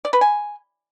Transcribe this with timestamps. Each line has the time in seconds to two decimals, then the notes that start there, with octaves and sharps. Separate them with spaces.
0.05 D5
0.13 B4
0.21 G#5